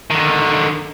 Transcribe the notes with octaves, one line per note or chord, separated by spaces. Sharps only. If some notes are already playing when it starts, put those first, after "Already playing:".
D3 D#3